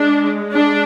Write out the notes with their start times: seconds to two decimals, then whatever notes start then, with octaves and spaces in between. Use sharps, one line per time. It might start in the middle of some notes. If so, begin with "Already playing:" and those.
Already playing: G#3 D4
0.53 D4